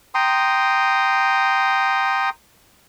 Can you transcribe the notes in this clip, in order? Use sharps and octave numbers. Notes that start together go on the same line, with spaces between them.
G5 A#5 C6 D#6